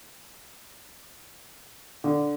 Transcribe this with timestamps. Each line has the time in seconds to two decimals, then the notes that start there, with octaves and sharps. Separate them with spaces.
2.04 D3